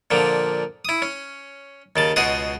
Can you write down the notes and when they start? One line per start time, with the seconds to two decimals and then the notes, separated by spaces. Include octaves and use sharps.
0.11 A#2 D3 F3
0.85 E4 D#6
1.02 C#4
1.96 D#2 C#3 A5
2.16 C#2 B2 F#4 G#4 C6 D#6